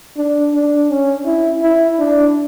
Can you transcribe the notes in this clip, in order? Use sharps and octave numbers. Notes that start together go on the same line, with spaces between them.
D4
D4
C#4
E4
E4
D4